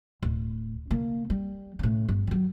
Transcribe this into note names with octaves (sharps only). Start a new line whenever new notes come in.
D1
C#3 A#3
G3
A2 C#3
G1
D#3 F#3